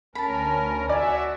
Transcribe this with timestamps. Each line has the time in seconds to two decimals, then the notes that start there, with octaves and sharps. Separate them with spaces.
0.15 D2 C#4 A#4 A5 B5
0.89 F#4 D5 E5 G#5